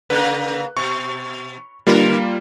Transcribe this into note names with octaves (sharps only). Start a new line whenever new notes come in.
C#3 A#3 B4 F#6
B2 C#6
D3 G3 A#3 F4 A#4 B4